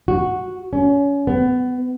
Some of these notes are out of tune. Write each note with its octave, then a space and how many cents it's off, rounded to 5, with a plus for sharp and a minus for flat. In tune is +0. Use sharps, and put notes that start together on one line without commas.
F#4 -5
C#4 +30
B3 +25